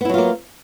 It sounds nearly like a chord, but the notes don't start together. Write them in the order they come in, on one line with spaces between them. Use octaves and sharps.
B3 E4 F#3 F4 A#3